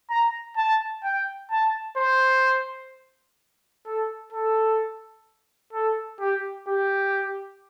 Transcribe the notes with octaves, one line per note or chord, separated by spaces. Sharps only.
A#5
A5
G5
A5
C5
A4
A4
A4
G4
G4